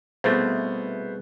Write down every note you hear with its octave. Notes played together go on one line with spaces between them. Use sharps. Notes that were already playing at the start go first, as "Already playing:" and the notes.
C2 B2 A3 B3 G#4 B4 C5